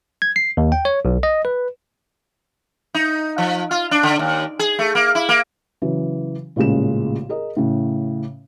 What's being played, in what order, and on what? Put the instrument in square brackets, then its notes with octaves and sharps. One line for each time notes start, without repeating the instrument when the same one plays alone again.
[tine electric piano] G#6
C7
D#2
G5
C#5
B1
D#5
B4
[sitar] D#4
F3
F4
D4
D3
D#2
G#4
A3
A#3
E4
A#3
[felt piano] C#3 E3 F#3
A1 A#2 C#3 G#3 E7
G#4 A#4 D#5
A2 C#3